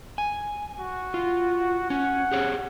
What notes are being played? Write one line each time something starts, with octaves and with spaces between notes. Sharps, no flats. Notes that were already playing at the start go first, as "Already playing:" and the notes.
G#5
F#4
F4
C#4 F#5
G4 G#4 C#5